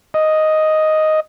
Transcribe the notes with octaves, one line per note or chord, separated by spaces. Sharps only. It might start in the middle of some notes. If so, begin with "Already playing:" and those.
D#5